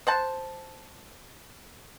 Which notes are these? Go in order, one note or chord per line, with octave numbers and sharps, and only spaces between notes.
C5 F#5 A5